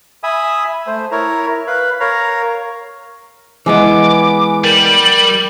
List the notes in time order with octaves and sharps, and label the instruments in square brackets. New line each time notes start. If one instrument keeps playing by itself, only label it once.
[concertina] E5 G#5 B5 D#6
A3 C5
E4 A#4 C#5 A#5
B4 F5 B5
A#4 C#5 F5 A#5
[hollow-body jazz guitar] E3 G#3 B3 [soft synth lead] G#5 [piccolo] D6
[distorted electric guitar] G3 [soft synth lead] A#4 [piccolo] F#7